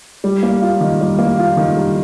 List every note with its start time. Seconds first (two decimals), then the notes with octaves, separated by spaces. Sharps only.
0.24 G3
0.43 A#3
0.61 F4
0.81 D#3
1.01 G3
1.19 A#3
1.38 F4
1.57 D#3
1.76 G3